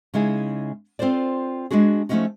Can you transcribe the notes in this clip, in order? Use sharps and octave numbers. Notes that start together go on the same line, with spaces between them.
C#3 G#3 D#4 E4 G#4
C4 F4 A4 C5 D5
G#3 B3 D4 F#4 G#4
F3 A3 A#3 C#4 D#4 F#4